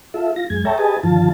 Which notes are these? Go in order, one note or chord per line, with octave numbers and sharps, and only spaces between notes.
F4 A4 E5
F4 A#6
F#2 G#3 G#6
A4 C#5 E5 G5 A5 A#5
G4 G#4 B4 D#5 G#5 A5
G2 D3 D#3 F3 F4 A5